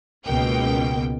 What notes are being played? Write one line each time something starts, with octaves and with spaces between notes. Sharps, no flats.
C#2 B2 A#3 G5